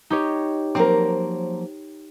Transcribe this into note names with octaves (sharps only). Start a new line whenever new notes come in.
D#4 G4 C#5
F3 F#3 A#3 C4 A#4